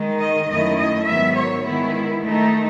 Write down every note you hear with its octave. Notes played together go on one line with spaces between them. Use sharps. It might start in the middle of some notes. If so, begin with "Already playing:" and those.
Already playing: D#3 G#3 D#4
D#5
F#2 D#3 A3 E4 D#5
D#5
G#2 D#3 F#3 B3 E5
C#5
D#3 G#3 B3 E4
D#3 A3 D#4